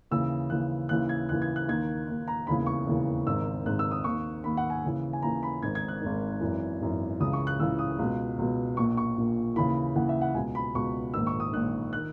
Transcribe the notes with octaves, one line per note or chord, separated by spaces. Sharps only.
D#2 C#3 E3 E6
D#2 C#3 E3 F#6
D#2 C#3 E3 F#6
G#6
D#2 C#3 E3 F#6
G#6
F#6
D#2 D#3 G#6
D#2 D#3
A#5
E1 D#2 C#3 E3 B5
C#6
E1 D#2 C#3 E3
G#1 G#2 D#3 E6
G#1 G#2 D#3 F#6
E6
D#6
D#2 D#3 C#6
D#2 D#3 B5
F#5
G#5
D#2 C#3 E3
G#5
D#2 C#3 E3 A#5
B5
G#1 G#2 D#3 G#6
G#6
F#6
G#1 G#2 D#3
G#1 F#2 E3
G#1 F#2 E3
C#2 C#3 E3 D#6
C#6
F#6
C#2 C#3 E3 E6
D#6
C#2 B2
C#2 B2
A#1 A#2 C#6
C#6
A#1 A#2
D#2 C#3 E3 B5
D#2 C#3 E3 F#5
E5
F#5
C#2 B2 G#5
B5
C#2 B2 C#6
A#1 G#2 D#3 E6
C#6
D#6
A#1 G#2 D#3 F#6
D#3 F#6